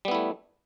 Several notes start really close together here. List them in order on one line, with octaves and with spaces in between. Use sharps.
G3 B3 E4 A3